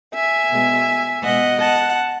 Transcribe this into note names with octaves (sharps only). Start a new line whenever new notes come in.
E5 G#5
B2 G#3
B2 G#3 D#5 F#5
F#5 A5